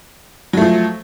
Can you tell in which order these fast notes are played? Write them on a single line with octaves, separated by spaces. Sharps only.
F#3 A3 F3